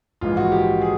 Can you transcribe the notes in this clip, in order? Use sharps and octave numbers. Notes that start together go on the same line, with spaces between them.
A#1 G#2 E3 G#3 F4
F#4
G4
G#4